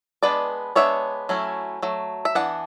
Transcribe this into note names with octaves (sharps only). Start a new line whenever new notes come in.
G#3 B3 D4 B4 D5
G#3 B3 D4 C#5 E5
F#3 A3 C#4 E4
F#3 A3
E5
E3 B3 D4 F#5